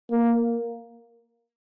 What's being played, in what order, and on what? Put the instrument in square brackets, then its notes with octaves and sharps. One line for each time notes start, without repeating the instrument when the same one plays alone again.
[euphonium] A#3